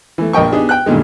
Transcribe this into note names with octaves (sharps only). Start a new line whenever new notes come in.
E3 A3
A#1 A#4 D#5 G5 C#6
B3 D4 D#4 G4 G#4
G5 F#6
G2 A#2 D3 D#3 G#3